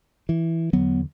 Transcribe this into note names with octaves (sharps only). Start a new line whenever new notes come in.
E3
E2 D3 F#3 B3